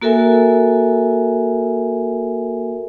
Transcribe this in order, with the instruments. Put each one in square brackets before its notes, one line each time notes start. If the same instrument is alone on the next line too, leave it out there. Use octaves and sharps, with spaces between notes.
[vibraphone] A#3 F#4 A4 A#4 E5 G#5